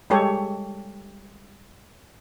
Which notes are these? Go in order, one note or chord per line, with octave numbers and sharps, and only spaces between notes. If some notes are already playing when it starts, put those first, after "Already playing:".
G3 G#3 G4 A4 C#5